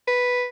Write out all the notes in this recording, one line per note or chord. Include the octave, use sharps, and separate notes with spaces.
B4